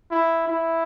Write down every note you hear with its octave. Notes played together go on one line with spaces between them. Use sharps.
E4
E4